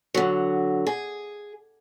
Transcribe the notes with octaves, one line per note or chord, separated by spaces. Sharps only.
D3 F#3
G#4